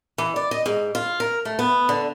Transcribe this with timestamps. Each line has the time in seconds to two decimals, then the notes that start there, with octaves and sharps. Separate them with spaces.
0.18 E3
0.36 D5
0.51 D#5
0.66 G#2
0.95 F4
1.20 A#4
1.45 A3
1.59 B3
1.89 D3